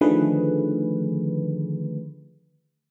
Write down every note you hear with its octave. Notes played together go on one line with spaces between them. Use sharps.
D3 D#3 F3 A3 G#4 B4